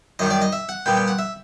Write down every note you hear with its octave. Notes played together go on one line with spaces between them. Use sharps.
F#2 D#3 G3 D#5
D5
D#5
E5
F#5
A#2 G3 B3 G5
G5
F#5
E5